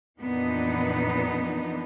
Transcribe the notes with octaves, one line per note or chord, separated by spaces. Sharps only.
F2 A#2 E3 B3 D4 D#4